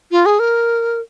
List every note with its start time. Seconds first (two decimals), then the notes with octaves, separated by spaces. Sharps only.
0.11 F4
0.26 G#4
0.39 A#4